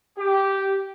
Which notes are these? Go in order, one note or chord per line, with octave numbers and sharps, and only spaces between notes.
G4